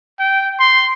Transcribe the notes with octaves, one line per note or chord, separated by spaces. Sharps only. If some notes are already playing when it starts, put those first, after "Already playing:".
G5
C6